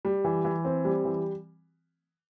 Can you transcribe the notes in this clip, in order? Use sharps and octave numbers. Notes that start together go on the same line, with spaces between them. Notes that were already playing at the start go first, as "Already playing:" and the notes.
G3
E3
E3
C4
G3
E3